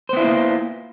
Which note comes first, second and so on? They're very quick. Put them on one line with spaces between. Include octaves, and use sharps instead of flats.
C5 B3 E4 F4 A#3